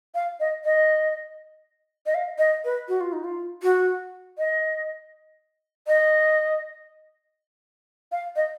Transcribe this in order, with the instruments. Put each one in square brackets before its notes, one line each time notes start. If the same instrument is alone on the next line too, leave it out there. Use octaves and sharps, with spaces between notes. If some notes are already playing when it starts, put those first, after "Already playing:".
[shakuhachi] F5
D#5
D#5
D#5
F5
D#5
B4
F#4
F4
D#4
F4
F#4
D#5
D#5
F5
D#5